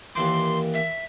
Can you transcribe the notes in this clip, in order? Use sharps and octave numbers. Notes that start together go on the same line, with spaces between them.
D#2 E3 C6 D6
E5